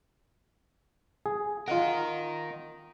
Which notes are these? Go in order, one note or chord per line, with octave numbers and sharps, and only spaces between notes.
G#4
F4 A#4 D#5 F#5